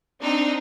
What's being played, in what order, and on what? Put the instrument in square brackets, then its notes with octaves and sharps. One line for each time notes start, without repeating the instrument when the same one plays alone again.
[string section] C4 D#4 [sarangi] D4